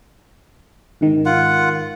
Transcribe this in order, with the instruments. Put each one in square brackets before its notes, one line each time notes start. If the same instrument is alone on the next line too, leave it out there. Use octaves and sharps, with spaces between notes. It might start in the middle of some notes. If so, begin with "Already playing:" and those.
[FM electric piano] G#2 D#3
[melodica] F4 F#5